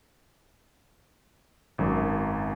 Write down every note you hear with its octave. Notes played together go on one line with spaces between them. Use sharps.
G#1 F#2